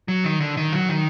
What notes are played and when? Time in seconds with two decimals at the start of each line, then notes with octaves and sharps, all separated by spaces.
0.08 F#3
0.24 D#3
0.40 D3
0.57 D#3
0.73 F#3
0.89 D#3